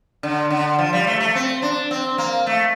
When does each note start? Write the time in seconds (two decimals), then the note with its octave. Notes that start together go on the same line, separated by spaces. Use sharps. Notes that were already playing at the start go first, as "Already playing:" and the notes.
0.23 D3
0.50 D3
0.78 F3
0.93 G3
1.07 A3
1.21 A3
1.35 C4
1.62 D4
1.91 C4
2.18 A#3
2.47 A3